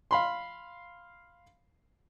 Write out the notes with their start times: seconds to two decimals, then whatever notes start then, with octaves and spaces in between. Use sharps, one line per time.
0.11 F5 B5 C6